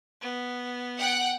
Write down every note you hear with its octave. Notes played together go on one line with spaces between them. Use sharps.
B3
F#5 G5 F#6